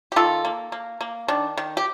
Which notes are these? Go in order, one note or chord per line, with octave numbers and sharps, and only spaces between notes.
G4
D#3 F4 A4
A#3
A#3
A#3
D#3 D4
D#3
G4